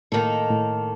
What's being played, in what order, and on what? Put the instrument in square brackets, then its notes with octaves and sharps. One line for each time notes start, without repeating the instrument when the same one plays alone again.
[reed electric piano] A2 [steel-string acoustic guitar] D#3 A#3 D#4 A4
[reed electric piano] A2